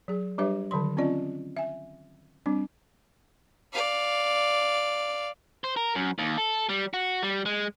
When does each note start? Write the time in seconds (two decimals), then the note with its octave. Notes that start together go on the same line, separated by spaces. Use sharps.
0.08 F#3 G#4
0.38 G3 D4 G4 B4 C#5 E5
0.71 D3 D#3 F#3 C6
0.97 C4 C#4 F4 D5 D#5
1.57 E5 G#5
2.46 G3 C4 D4
3.73 D5 F5
5.64 C5
5.77 A#4
5.95 F#2
6.19 D#2
6.38 A4
6.69 G3
6.94 F#4
7.23 G3
7.46 G#3